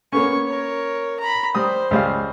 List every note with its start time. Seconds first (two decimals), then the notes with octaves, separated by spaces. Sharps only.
0.13 A#3 B3 C#4 C#5 C#6
0.47 A#4 C#5
1.20 A#5 B5
1.55 G3 C5 D#6
1.91 C#2 G3 F5